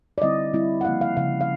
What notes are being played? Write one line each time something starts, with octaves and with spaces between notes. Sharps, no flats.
D5
D3 G3 C4 E4 D#5
D3 G3 C4 E4
F#5
C#3 F3 A#3 F5
F5
C#3 F3 A#3 F5
F5